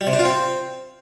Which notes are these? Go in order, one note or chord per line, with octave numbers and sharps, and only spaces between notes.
G3
C3
D4
F4
C4